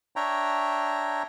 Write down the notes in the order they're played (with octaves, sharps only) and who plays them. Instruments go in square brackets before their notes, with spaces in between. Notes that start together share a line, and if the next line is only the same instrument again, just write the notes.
[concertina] D4 C#5 E5 G5 A#5